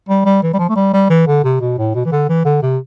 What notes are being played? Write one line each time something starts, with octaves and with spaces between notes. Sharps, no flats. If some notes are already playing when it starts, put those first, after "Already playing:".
G3
G3
E3
G3
F3
A3
G3
G3
E3
D3
C3
B2
A2
B2
E3
D3
E3
D3
C3